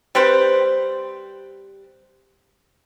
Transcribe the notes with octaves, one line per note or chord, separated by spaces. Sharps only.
G3 C4 B4 C5